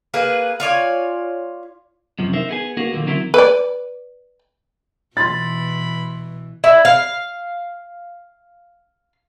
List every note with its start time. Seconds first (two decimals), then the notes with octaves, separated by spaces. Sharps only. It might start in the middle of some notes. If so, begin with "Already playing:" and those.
0.14 A#3 G#4 B4
0.60 F4 C#5 D5 G#5
2.19 F#2 C3 F3
2.33 D#4 A#4 C5 E5
2.49 B3 G#4 G#5
2.77 A#3 B3 D#4 F#4 G#4 A#4
2.93 D#2 A#2 D3 F3 A#3
3.06 D3 F#3 C4 E4 A#4 C5
3.34 B4 D5
5.17 B2 E3 B5 C6 A6
6.64 E4
6.85 F5